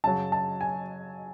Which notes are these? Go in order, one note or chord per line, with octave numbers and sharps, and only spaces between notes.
F#2 C#3 F#3 A5
A5
G#5